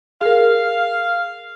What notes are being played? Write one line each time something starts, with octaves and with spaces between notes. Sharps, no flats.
G#4 A#4 F5